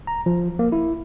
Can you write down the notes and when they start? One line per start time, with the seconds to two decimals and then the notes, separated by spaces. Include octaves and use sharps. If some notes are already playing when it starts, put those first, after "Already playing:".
0.07 A#5
0.26 F3
0.59 A#3
0.72 E4